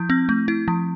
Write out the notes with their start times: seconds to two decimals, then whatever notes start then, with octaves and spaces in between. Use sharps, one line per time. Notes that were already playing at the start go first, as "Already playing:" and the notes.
Already playing: F3 E4 G6
0.10 C4
0.29 A3
0.48 E4
0.68 F3